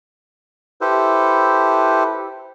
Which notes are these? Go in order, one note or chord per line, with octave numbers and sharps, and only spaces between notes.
E4 G4 A4 B4 C5